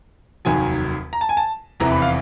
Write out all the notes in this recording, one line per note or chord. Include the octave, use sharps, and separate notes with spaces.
F1 D#2 D#3 F#3 G#5
A#5
A5
G#5
A5
F1 E2 C3 E3 A#5
B5
F5